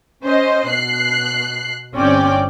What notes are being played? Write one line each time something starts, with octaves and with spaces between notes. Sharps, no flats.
C#4 C5 D#5
B2 F#6 C7
G1 C4 C#4 D5 G5 D6